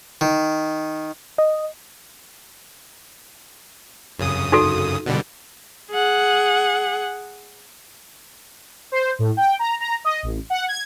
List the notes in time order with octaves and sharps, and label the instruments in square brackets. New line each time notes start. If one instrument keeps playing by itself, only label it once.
[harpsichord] D#3
[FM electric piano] D#5
[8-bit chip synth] F#2 C#3 D#6
[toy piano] D#4 F#4 A4
[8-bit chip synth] B2 D3 G3
[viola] G#4 F#5
[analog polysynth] C5
A2
G5
A#5
A#5
D#5
A1
F#5
G#6